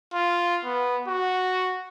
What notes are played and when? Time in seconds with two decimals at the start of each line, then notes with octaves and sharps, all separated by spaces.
0.13 F4
0.65 B3
1.08 F#4